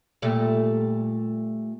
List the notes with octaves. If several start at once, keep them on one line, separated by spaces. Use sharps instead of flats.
A#2 G3 A3